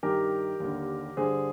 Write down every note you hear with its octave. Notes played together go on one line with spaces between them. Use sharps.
G2 D#3 G4 A#4
D#2 D3
G2 D3 G#4 C5